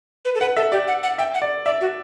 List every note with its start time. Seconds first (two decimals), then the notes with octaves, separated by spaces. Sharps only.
0.25 B4
0.35 A4
0.41 B4 F#5
0.56 A4 E5
0.72 G4 D5
0.87 F#5
1.03 F#5
1.18 E5 G5
1.34 F#5
1.42 D5
1.65 D5 E5
1.81 F#4